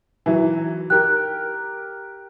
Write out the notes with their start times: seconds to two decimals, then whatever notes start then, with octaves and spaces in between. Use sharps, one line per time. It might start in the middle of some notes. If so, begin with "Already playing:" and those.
0.26 E3 F#3
0.90 G4 A#4 F#6